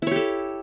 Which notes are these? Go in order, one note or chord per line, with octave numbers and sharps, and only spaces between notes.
E4 G4 A4 C#5